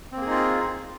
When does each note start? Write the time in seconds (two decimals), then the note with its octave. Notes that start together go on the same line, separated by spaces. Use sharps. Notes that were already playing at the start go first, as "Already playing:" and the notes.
0.12 C4
0.17 A#3
0.21 G#4
0.26 D#4
0.31 F4